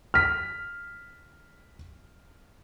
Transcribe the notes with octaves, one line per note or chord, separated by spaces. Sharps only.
F6 B6